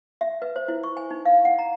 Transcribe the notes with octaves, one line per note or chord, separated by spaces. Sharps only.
E5
B4
C5
E4
C#6
G#5
D#4
F5
F#5
A#5